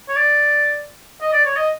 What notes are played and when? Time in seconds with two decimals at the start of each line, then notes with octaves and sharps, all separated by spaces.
0.09 C#5
0.16 D5
1.21 D#5
1.33 D5
1.45 C#5
1.56 D#5